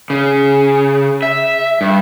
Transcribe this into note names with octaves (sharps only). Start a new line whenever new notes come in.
C#3
E5
G2